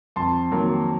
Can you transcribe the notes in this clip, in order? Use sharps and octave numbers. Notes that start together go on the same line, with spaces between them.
F2 A5 C6
D#3 F#3 A#3